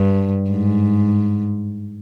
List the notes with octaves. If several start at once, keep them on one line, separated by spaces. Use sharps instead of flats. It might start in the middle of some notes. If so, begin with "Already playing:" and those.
Already playing: G2
G#2